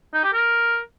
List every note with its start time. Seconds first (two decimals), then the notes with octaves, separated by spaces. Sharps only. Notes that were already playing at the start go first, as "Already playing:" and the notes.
0.14 D#4
0.24 G4
0.33 A#4